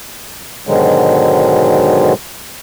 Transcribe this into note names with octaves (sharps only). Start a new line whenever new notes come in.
G#2 B2 D3 D#3 F#3 G#3